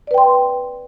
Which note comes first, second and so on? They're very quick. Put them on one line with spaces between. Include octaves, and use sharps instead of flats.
D5 B4 G5 C6